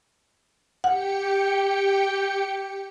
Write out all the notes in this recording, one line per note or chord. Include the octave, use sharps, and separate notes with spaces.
G4 F#5 G5 C#7